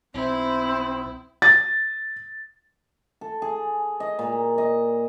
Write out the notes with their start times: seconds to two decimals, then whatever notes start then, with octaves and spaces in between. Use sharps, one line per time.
0.14 B1 C4 E4
1.42 A6
3.21 A4
3.42 G#4
4.00 D#5
4.19 A#2
4.58 D#5